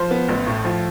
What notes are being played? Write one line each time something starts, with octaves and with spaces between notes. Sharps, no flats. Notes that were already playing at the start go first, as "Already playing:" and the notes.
Already playing: F3 C5
B3
A1
A2
F3